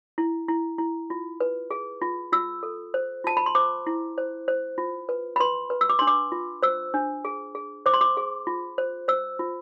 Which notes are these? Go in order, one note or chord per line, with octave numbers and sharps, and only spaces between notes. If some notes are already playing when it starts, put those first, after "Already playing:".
E4
E4
E4
F4
B4
G#4
F4
F4 E6
A4
C5
F4 A5
B5
C6
C5 D6
E4
C5
C5
F4
B4
B5
B4 C6
B4
E6
D6
D4 C6
D6
F4
C5 E6
D4
G#4
G#4
C5 D6
C6
D6
G#4
F4
C5
C5 E6
F4